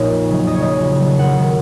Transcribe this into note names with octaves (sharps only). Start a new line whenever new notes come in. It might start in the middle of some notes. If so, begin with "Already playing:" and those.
Already playing: A#1 A#2 F3 D#4 C#5 D#5
F2
C#3 F#3
F2 D#5
C#5
C#3 F#3 D#5
F2
D#3 F#3
F2 F#5
D#3 F#3